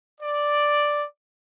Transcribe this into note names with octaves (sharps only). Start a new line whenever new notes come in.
D5